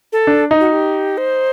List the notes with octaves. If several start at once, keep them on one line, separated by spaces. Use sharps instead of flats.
A4
D4
D#4
F#4
G4
C5